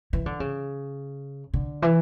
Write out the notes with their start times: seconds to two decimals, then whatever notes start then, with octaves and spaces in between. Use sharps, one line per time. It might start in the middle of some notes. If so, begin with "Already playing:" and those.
0.13 E3
0.26 D3
0.40 C#3
1.54 D3
1.82 E3